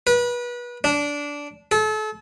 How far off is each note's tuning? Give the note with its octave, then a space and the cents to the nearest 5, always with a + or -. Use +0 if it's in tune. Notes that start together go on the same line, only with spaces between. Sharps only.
B4 -30
D4 -15
A4 -35